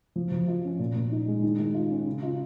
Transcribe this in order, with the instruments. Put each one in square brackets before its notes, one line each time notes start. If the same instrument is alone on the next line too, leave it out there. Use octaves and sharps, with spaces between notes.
[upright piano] F3
F3
F4
C#4
A#2
A#2
D#4
G#3
D#3
D#3
F4
C#4
C#3
F4